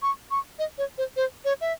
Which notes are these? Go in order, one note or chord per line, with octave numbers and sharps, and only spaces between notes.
C#6
C#6
D#5
C#5
C5
C5
C#5
E5